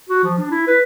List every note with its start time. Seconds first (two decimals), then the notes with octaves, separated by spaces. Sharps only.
0.09 F#4
0.23 F3
0.38 D4
0.51 E4
0.67 B4